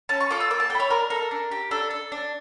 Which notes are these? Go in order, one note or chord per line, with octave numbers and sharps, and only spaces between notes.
C#4 A5
C#6
F4 A4 D6
E6
A#3 D6
A5
E4 A4 G5
C#5
D4 A#4
A4 A#4
D4
G4
D4 A4
A4
D4